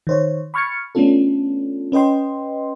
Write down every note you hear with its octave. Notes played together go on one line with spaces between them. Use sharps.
D#3 C5 C#5
B5 C#6 F6 G#6 A6 C#7
A3 B3 C#4 D4 F4 A4
C#4 B4 D#5 G5 C6